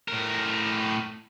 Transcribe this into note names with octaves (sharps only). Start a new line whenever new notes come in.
A2 A#4